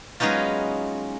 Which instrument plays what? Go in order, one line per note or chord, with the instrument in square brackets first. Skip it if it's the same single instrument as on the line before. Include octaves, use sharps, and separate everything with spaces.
[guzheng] F#3 G#3 B3 C#4 D#4 F4